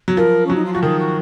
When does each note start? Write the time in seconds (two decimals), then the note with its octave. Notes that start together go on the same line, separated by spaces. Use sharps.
0.08 F#3
0.16 F3 A#4
0.46 F#3 C#4
0.55 D#4
0.65 F4
0.73 F3 F#4
0.82 D#3 G#4
0.99 F#4